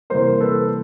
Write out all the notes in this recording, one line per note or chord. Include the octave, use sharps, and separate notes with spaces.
C3 E3 G3 A#3 A#4 C5
A4 B4